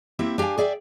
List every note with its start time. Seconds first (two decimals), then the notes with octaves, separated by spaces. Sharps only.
0.19 A#3 C4 E4 G4 E5
0.38 D4 G4 D#5 F5 G#5
0.58 G#4 D5 E5 F#5 G5